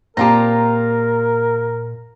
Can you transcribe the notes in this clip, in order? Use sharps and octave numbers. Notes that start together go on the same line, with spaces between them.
A#2 C4 F4 G4 A#4 A5 A#5